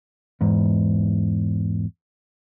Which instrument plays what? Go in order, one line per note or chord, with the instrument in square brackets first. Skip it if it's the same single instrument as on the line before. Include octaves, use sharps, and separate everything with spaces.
[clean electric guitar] E2 G#2